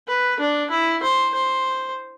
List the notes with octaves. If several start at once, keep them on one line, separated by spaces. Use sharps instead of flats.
B4
D4
E4
C5
C5